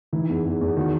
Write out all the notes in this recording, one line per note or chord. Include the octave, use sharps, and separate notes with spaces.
E3 D#4
E2
E2
E2
D#3 F#4